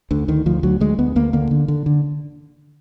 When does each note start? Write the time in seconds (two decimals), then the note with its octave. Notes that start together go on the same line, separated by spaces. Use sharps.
0.11 D2 D3
0.28 D2 D#3
0.46 D2 F3
0.63 D2 F#3
0.80 D2 G#3
0.98 D2 B3
1.16 D2 A#3
1.33 D3 A#3
1.51 D3
1.68 D3
1.86 D3